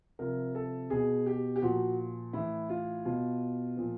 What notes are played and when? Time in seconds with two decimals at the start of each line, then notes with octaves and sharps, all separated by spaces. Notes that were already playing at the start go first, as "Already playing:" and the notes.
0.19 C3 F3 A#4
0.55 A4
0.90 B2 G#4
1.26 G4
1.56 G4
1.62 A#2 F3 F#4
2.33 A2 E3 E4
2.69 F4
3.05 B2 F4
3.77 A#2 F3